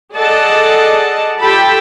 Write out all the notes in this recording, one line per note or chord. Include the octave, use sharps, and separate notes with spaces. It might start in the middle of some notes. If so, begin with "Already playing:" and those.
G#4 A4 D5 D#5 F#5 A5
F4 G4 A4 G5 A5 B5